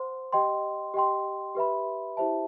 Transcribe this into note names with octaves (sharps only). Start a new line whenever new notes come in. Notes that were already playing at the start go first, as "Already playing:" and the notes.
Already playing: C5 F#5 C6
G4 D#5 G5 C6
G4 D#5 G5 C6
G4 B4 E5 B5
E4 G4 C5 E5 A5